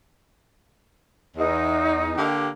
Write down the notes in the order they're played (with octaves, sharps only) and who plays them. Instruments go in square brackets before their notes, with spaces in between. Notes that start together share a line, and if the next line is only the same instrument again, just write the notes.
[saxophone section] E2 [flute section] D#4
[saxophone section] D3 A#3 G4